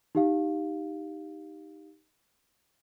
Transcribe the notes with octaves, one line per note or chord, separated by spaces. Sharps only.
D#4 G4 F5